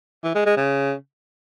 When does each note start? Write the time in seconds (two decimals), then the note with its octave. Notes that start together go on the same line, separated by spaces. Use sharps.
0.24 E3
0.35 G#3
0.46 G#3
0.57 C#3